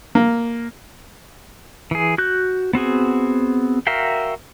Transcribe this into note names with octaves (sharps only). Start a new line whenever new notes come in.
A#3
E3 G#4
F#4 F#6 G6
B3 C4 F#4 G#4
F#4 A#4 E5 F5 G5